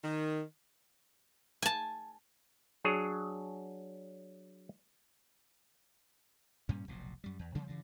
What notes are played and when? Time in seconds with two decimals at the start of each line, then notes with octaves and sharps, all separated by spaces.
0.03 D#3
1.62 G#5 A5
2.84 F#3 D4 G#4 C#5
6.69 G2 A#2 G3 C#4
6.88 F1 B1 A#2
7.24 F#2 G3
7.39 E2
7.55 C3 F3 G3 A#3
7.67 G2 C#3 E3